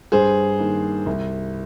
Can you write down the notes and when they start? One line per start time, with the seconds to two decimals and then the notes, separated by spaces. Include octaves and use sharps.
0.12 G2 G#4 C5
0.59 D#3 A#3
1.06 C2